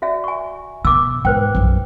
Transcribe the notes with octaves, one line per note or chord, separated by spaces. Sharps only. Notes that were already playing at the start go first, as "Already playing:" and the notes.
F#4 D5 E5
G#5 C#6
B2 D6 E6
G#2 B4 C5 G5
B1 F#2